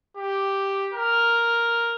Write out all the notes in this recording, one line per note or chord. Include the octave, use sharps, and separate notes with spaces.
G4
A#4